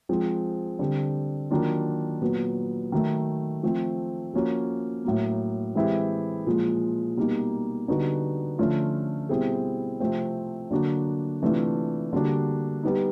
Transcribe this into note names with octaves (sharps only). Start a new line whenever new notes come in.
F3 G#3 C4
D3 G3 C4
D#3 F#3 A#3 D4 F4
A#2 F#3 B3
D#3 F#3 A3
F3 A3 C4
F3 A#3 C#4 F#4
A2 F#3 A#3
E3 G#3 C4 E4 G4
A#2 F3 G#3
B2 G3 A#3 D#4
D3 G3 B3 D#4 F#4
D3 F3 A3 C#4 F4
B2 G3 C4 E4 G#4
C3 F3 A3 C4
D3 F#3 A#3 D4 F#4
C3 E3 A3 D4 F4
D3 G3 A#3 D4 F#4
G3 B3 D#4